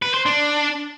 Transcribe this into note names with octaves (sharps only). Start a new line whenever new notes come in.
B4
C5
D4